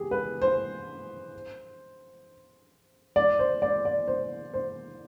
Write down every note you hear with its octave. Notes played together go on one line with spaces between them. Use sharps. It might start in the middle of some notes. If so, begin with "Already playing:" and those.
Already playing: G4 G#4
B4
C5
D5
C5
D5
D5
C5
C5